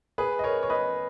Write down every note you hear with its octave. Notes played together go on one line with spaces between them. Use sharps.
G#4 B4
D#5
A#4 C#5
C#5
B4 D#5